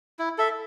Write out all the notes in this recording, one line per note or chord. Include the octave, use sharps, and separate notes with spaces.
E4
A4 E5